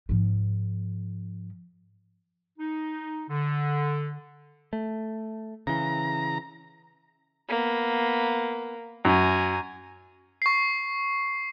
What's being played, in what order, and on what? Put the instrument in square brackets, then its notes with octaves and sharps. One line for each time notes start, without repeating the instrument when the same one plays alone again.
[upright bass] G#2 F3
[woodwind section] D#4
D3
[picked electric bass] A3
[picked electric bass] C#3 E3 [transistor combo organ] A#5
[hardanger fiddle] A#3 B3
[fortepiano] F#2 [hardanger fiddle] G#5 A#5
[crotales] C#6 C7